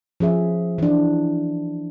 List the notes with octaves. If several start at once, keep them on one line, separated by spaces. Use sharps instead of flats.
F3 C#4 G#4 E5
E3 D4